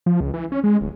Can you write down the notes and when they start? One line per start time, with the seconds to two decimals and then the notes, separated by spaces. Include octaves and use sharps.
0.06 F3
0.20 C#2
0.34 E3
0.52 C#4
0.64 G#3
0.81 D1